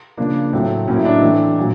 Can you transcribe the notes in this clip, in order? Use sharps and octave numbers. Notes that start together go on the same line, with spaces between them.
C#3 F3 A#3 D4
A2 F#3 A3 C4
A2 F#3 A#3 C#4
E4
D4
D#4
E3 A3 C4 D4
A#2 F#3